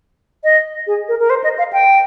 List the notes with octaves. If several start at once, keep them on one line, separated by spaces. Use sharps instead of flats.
D#5
G#4
A#4
A#4
C5
D#5
F5
G5